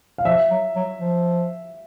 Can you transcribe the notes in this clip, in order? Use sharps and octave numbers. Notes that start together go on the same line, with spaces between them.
F5
F3 E5
F#3
F#3
F3